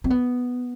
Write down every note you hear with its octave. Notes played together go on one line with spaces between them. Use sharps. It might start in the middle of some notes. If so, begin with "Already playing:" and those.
C4
B3